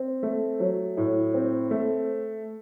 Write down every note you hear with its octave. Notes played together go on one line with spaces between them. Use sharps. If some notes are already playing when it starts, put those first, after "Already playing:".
Already playing: C4
A3
F#3
A2
C4
A3